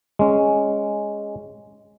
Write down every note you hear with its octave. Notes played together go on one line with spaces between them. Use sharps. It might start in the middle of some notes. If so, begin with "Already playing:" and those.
G#3 C#4